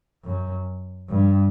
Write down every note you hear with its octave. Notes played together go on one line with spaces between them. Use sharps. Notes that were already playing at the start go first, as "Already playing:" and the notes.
F#2
G2